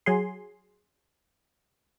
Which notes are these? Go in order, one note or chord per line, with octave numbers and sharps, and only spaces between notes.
F#3 G#4 C6